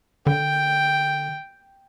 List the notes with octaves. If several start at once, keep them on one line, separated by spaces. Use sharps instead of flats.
D3 G5